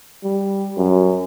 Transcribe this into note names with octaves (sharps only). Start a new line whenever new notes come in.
G3
F#2